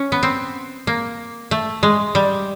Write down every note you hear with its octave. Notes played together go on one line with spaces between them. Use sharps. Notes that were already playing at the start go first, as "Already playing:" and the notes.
Already playing: C#4
B3
C4
A#3
A3
G#3
G3